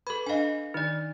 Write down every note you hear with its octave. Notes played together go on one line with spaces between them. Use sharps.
A4 B4 B5
D4 D#5 F5 G#5
D#3 D#4 D5